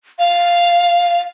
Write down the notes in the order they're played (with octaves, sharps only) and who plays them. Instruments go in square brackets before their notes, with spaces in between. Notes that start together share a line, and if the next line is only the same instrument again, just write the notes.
[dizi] F5